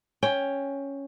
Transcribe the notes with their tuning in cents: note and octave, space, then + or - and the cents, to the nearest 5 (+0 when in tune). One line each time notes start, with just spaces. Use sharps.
C#4 +0 G5 +10